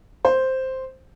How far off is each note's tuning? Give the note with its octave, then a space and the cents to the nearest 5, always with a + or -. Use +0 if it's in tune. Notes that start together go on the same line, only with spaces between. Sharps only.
C5 +0